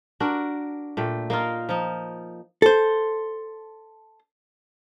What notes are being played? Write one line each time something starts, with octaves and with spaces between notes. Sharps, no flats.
D4 F#4 A#4
A#2 A3 G5
A#3 D#4 F4
F3 D#4
A4 C5